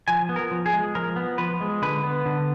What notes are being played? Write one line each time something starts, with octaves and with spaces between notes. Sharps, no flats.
F3 G#5
B3
A#4
F3
G#4
G#3
F3 A#4
B3
F3 B4
G#3
D3 B4
B3
D3